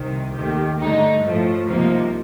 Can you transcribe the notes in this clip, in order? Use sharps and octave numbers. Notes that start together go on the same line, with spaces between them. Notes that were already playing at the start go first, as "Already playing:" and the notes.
Already playing: C2 C3 D#3
D#2 D#3 A3 G4
G2 D3 A3 D#4
A2 F3 A3
C2 C3 F3 A#3 D#4